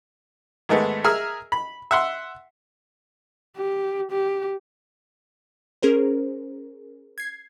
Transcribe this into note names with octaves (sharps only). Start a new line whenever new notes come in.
G#2 D#3 G#3 A3 B3
G#4 A#4 E5 E6 F6
B5
E5 F#5 C6
G4
G4
C#4 G#4 A#4 C5
G#6 C7